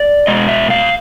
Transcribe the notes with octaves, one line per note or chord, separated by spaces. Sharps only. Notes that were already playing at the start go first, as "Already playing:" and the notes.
Already playing: D5
B2 G#3 D#5
E5
F5